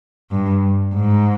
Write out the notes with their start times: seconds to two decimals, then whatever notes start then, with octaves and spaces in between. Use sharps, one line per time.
0.31 G2
0.94 G#2